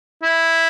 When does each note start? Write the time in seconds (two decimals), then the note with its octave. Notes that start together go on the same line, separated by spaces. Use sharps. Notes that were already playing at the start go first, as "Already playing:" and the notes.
0.23 E4